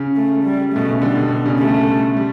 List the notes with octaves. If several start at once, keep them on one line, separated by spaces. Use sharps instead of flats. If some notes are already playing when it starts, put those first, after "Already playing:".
Already playing: C#3
A3
G3
B2 A3
C#3
D3 G3
B2
D3
C#3
G3 A3
G3